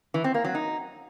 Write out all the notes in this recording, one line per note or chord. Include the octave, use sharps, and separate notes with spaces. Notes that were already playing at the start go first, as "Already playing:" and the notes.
E3
C4
A#3
F#3
D#4